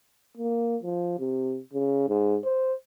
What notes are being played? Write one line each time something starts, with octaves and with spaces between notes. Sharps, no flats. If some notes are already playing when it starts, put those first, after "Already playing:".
A#3
F3
C3
C#3
G#2
C5